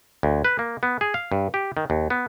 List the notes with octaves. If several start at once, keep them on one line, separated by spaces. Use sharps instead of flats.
D2
B4
A#3
B3
G#4
F5
G2
G4
D#3
D#2
B3